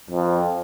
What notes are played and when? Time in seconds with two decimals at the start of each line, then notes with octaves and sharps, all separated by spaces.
0.10 F2